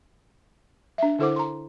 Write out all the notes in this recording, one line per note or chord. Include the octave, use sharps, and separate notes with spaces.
D4 E5
D3 E4 A4 C5 F#5 D6
A#5 C6